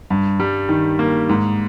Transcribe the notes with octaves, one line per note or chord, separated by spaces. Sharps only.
G2
G3
D#3
A#3
G#2